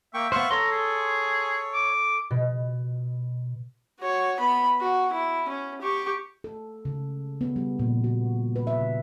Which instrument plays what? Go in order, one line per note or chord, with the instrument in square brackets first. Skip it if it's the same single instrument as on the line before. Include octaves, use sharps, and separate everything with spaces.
[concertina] A#3 G5 C#6 [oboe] E5
[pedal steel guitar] B3 C5 [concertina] F5 C#6 F#6
[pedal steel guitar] A4 C6 [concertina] C#5 [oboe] A#5
[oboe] G#4
D6
[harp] B2
[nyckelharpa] F#4 C#5
B3 B5
F#4
E4
C#4
G4 C#6
[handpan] A4
C#3
B3
G3
A#2
F#4
B4
E5
C#3